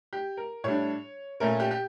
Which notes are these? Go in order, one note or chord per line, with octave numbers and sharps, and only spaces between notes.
G4
A#4
A2 G3 D4 C#5
A#2 A3 C#4 A#4
G4
G4